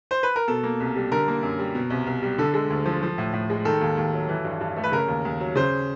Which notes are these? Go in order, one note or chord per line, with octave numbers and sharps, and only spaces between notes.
C5
B4
A#4
B2 A4
A#3
C2
G3
D3 A#4
A#3
F#2
G3
B2
C2
C2
G3
D3 A4
G#3
D2
F3
F3
A2
A2
G#3
D#3 A4
D#2
D#2
F#3
E3
G2
G2
A3
B4
C#3 A#4
D#2
D#2
F#3
C#3 C5